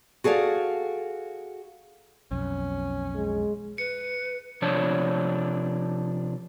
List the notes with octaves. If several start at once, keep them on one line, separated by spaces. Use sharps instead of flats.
F#4 G#4 A4 D5 F5
B1 F2 C#4
G#3
B4 C#7
C3 F3 D4 C#5 A5